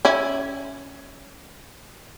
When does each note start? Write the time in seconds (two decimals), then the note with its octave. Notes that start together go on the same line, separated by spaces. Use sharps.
0.05 C#4 E4